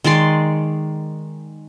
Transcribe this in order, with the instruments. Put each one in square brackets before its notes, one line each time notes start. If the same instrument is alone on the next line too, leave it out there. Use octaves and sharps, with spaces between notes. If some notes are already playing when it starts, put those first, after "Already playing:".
[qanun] D#3 G#3 D5 C6